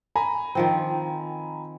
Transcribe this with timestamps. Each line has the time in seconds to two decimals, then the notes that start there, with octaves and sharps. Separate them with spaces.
0.16 G#5 A#5 B5
0.55 D#3 F3 C4